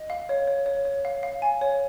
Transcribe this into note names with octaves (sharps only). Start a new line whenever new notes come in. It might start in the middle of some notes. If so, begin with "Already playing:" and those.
Already playing: D#5
F5
C#5
C#5
C#5
C#5
F5
F5
G#5
C#5